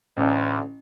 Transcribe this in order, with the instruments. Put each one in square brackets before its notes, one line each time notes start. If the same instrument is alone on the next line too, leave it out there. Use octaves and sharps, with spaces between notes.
[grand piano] A1 [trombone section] D2